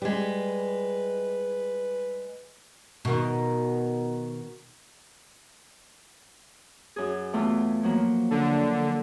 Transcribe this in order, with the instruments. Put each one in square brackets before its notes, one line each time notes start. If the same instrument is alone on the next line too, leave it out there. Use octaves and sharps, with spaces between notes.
[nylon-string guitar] G3 G#3 [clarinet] B4
[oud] B2 D#3
[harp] F#2 G#4
E2 A3 F4
F3 F#3 A#3
[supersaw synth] D3